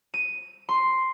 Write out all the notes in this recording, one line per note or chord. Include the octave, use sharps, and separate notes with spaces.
D#7
C6